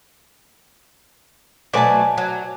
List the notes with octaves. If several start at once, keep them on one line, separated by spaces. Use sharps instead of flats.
B2 F#3 A3 D5 G#5 A5
F#3